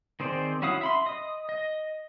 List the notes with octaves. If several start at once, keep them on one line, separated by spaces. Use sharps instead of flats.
D#3 C4 G#4 C5 D5
C#4 E4 F#4 F5 D#6
E5 B5 C6
D#5 D#6
D#5